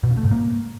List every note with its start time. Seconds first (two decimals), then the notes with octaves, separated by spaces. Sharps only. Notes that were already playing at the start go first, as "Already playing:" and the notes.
0.03 B2
0.10 C#3
0.17 A3
0.24 G#2
0.31 A#3